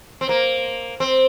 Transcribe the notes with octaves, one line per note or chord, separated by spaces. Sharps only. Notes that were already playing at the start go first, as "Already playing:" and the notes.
C4
A#3
C4